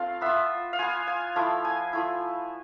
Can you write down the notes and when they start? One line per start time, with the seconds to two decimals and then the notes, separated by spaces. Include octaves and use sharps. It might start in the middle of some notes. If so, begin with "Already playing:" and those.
Already playing: A3 C4 F4 F5
0.21 B3 F4 E5
0.73 F5
0.79 B3 F4 G#5
1.07 G#5
1.36 F3 A3 E4 F5
1.65 G#5
1.93 F3 A3 E4